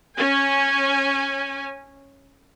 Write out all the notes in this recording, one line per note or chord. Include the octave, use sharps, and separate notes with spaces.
C#4 G#5